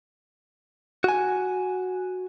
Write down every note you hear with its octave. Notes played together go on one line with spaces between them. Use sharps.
F#4 G#5